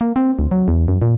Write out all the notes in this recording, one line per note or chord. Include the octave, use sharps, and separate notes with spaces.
A#3
C4
D2
F#3
E2
F#2
A#2